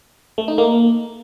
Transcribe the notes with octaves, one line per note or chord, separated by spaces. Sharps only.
A3
D#4
A#3